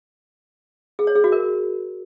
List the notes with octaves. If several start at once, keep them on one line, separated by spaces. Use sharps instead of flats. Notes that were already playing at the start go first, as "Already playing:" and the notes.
G#4
C#5
G#4
F#4
A#4